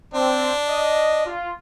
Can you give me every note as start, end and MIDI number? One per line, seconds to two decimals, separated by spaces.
0.14 0.49 60
0.14 1.33 62
0.69 1.25 75
1.26 1.50 65